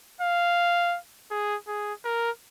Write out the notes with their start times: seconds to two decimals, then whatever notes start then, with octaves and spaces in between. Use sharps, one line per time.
0.21 F5
1.31 G#4
1.67 G#4
2.05 A#4